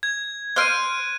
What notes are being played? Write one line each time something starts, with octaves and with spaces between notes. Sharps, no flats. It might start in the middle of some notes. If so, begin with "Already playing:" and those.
G#6
C5 F6 F#6 D7 D#7